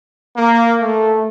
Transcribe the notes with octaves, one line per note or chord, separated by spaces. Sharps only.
A#3
A3